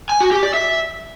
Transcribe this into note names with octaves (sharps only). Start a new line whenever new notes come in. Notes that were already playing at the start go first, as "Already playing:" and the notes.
G#5
F#4
G4
D5
E5